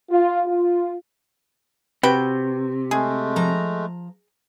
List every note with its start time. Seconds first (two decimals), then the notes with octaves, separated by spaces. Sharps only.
0.11 F4
0.46 F4
2.03 C3 F#4 B4 G5
2.91 G#3 A3 G#4
3.36 F3 A#5